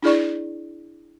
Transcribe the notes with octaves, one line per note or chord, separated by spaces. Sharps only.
D4 E4 G#4 D5 C#6